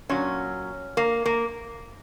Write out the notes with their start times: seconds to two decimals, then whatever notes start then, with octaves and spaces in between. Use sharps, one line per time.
0.09 A#2 F#3 C#4
0.97 A#3
1.26 A#3